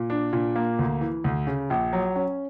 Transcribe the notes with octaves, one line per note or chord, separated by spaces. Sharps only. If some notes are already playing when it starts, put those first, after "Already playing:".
Already playing: A#2
D4
A#2
A#3
D2
E3
D2
C#3
A#1
F#3
C#4